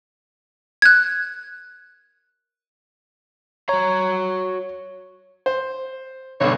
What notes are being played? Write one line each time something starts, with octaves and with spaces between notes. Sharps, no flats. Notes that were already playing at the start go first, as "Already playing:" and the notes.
F#6 G#6
F#4 C#5 A#5
C5
B1 G2 D3 C#5